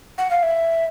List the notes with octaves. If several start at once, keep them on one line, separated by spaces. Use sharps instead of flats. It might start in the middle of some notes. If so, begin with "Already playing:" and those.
F#5
F5
E5